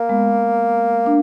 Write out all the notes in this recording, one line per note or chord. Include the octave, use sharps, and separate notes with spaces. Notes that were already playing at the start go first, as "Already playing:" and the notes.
Already playing: A#3
G#3 B3
D4